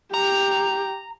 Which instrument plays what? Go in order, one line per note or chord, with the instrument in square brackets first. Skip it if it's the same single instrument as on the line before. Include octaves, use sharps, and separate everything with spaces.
[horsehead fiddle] G4 [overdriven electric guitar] A#5